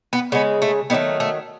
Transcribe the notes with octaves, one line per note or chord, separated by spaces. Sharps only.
B3
C#3 G#3 B3
A3
D#3 F#3 A3 B3
A3